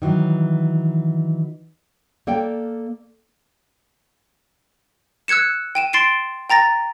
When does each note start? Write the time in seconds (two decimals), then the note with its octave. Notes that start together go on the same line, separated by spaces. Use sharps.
0.02 D#3 E3 F#3
2.27 A#3 A4 D5 F5 G5
5.28 E6 F#6 G#6 C#7 E7
5.75 G5 D#7 E7
5.93 C6 A6 C7 D7 E7
6.50 G5 A#5 A6 A#6